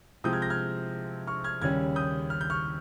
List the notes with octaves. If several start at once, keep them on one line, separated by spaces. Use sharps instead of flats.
C3 F3 G#3 C4 D#6 G6
F6 G#6
G6 A#6
F6 G#6
C#6 F6
F6 G#6
D#2 C#3 G3 C#4 F6 G#6
D#6 G6
F6
G6
C#6 F6